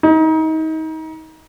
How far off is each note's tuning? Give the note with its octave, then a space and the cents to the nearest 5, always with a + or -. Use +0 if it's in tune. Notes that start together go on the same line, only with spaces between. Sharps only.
D#4 +30